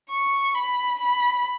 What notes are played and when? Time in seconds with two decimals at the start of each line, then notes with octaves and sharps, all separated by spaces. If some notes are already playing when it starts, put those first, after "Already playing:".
0.10 C#6
0.55 B5
1.00 B5